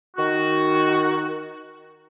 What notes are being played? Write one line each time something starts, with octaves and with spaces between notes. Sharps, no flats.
D#3 F#4